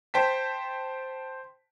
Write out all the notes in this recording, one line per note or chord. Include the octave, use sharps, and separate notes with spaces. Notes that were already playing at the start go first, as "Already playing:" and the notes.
C5 G5 A5 B6